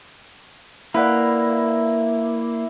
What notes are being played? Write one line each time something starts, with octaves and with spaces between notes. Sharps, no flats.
A#3 E4 B4 D5 F#5